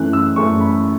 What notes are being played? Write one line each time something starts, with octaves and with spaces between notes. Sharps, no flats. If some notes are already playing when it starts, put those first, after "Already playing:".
Already playing: F#2 E3 A3 C#4 F#6
E6
F#2 E3 A3 C#4 C#6
B5